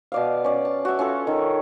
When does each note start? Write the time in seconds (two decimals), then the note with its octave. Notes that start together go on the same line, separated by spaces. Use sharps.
0.12 B2 D5 F5
0.44 C#4 D5
0.65 A5
0.85 F#4 E5
0.99 C#4 F4 A4
1.27 D#3